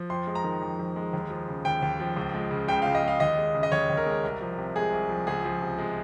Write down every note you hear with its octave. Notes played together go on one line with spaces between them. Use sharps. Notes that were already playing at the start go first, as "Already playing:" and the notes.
Already playing: F3
F2 C6
G#3
A#5
D#3
F2
F2
G#3
D#2
F3
C#3
D#2 G5
D#2
F3
C#2
G#3
C#3
C#2 G5
C#2 F5
D#5
G#3
F5
D#2 D#5
G#3
C#3
D#5
D#2 C#5
D#2
A#4
G#3
C2
F3
C3
G#3 G#4
C2
F3
C#2 G#4
F3
C3
G#3